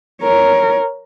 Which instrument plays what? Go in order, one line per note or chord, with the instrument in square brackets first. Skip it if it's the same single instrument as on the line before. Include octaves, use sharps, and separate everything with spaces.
[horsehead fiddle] A#4 C#5